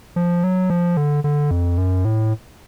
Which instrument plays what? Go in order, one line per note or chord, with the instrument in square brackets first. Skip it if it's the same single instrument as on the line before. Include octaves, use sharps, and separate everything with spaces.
[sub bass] F3
F#3
F3
D3
D3
F2
F#2
A2